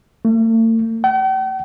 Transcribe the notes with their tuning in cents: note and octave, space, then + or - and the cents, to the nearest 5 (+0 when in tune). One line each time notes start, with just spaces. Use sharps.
A3 +45
G5 -45